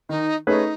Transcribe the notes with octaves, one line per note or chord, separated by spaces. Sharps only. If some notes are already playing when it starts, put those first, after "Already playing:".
D#3 D#4
A3 C#4 D#4 G#4 B4